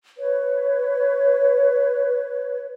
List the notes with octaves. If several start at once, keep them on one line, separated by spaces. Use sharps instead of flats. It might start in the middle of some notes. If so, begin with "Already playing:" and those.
B4 C#5